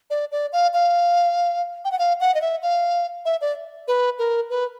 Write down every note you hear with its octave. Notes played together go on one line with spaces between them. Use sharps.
D5
D5
F5
F5
G5
F#5
F5
F#5
D#5
E5
F5
E5
D5
B4
A#4
B4